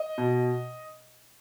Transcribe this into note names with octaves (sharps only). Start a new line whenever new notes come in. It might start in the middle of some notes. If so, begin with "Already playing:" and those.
Already playing: D#5
B2